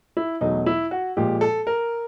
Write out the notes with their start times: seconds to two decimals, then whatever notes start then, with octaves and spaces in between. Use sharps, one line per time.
0.17 E4
0.41 E2 B2 F#3 A3 D#4
0.66 E4
0.91 F#4
1.17 A#2 F3 G#3 G4
1.41 A4
1.67 A#4